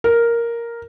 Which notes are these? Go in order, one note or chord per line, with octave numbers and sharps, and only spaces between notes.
A#4